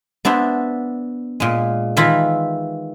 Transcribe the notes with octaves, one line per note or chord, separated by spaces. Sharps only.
B3 D4 E4 C5
A#2 G#3
D#3 E3 E4 F4 B5